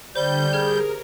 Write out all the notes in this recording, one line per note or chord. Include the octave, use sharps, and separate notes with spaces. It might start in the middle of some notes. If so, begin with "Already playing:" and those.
D3 G3 C5 G6
G4 G#4 A#4 F6 G#6